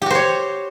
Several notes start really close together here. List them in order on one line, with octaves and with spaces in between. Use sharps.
G4 F#4 C5 C#5